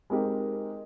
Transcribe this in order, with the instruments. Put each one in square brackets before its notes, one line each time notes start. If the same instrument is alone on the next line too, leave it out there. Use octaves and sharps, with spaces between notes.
[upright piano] G#3 C4 D#4 G4 A#4